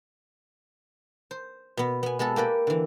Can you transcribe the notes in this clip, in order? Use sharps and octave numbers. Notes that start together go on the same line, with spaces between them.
C5
B2 B3
B3 G#5
G#3 B3 G#4 A4
A#3 G4 B4 D5
D3 E3